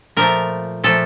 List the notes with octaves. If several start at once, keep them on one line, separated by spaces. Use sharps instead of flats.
A#2 F3 A3 A#4
A#2 F3 A3 A4